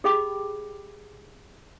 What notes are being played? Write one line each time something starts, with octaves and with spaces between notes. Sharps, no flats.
G4 G#4 D#5 G5 B5 D6